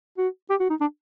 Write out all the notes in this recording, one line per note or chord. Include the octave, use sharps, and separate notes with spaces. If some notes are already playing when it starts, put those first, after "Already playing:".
F#4
G4
F#4
D#4
D4